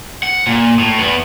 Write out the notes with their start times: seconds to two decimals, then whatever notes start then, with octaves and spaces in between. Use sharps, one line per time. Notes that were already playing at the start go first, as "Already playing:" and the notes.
0.23 F#5
0.47 A#2
0.79 A2
0.99 E2 B3